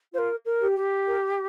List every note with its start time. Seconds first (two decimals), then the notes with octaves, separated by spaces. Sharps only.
0.14 F4 C5
0.18 A#4
0.45 A#4
0.61 G4
0.76 G4
1.07 A#4